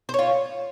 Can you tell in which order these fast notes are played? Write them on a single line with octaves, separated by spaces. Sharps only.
C5 C#5 F4